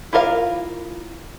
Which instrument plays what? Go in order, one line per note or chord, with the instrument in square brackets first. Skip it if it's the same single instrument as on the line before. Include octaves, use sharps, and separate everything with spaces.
[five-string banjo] E4 F4 A#4 E5 F5